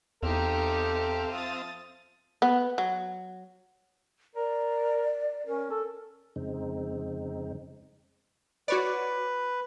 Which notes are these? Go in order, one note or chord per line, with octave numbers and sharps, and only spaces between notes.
E2 C4 D#4 G4 A4 E5 F5
F3 D#6 A6
B3
F#3
A#4 D5
C#4 A#4
A4
F2 C#3 G#3 C4 D#4
F#4 B4 C#5 D5